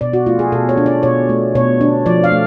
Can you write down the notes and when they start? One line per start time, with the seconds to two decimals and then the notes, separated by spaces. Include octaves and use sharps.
0.01 B2 D5
0.13 F#4
0.26 A3 F4
0.39 G#4
0.52 B2 A4
0.69 C#5
0.77 D4
0.86 D5
1.03 B2 C#5
1.29 A3
1.55 B2 C#5
1.81 D4
2.06 F3 D5
2.24 F5
2.32 A3